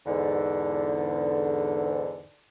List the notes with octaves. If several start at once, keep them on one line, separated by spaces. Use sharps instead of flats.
E2 G#2 D3